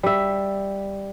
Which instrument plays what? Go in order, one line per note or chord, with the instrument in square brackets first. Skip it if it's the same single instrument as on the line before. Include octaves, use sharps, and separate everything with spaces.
[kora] G3 E5